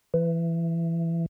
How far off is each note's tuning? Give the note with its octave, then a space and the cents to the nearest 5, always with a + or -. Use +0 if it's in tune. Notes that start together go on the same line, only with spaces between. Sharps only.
E3 +20